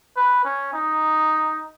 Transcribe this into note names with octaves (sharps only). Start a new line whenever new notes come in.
B4
C#4
D#4